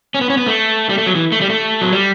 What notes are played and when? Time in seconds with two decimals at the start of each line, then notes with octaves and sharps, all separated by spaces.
0.14 C#4
0.21 B3
0.30 C#4
0.37 B3
0.47 A3
0.89 G3
0.98 A3
1.06 F#3
1.15 E3
1.32 A3
1.41 G3
1.50 A3
1.81 F#3
1.92 G3